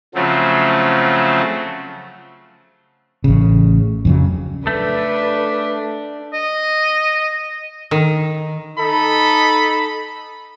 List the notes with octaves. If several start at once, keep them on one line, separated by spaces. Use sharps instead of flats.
C#3 F3 F#3 A3 C4
A1 C#3
F2 C#3 F#3
A3 D4 B4
D#5
D#3
D#4 A4 B5